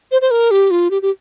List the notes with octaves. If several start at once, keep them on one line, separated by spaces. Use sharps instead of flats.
C5
C5
A#4
G4
F4
G4
G4